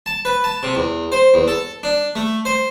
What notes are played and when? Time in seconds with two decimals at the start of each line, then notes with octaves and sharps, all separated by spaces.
0.06 A5
0.25 B4
0.44 A5
0.63 C3
0.75 E2
1.12 C5
1.34 E2
1.48 A4
1.83 D4
2.15 A3
2.45 C5